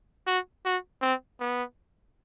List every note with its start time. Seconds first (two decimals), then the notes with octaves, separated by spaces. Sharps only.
0.27 F#4
0.66 F#4
1.02 C4
1.41 B3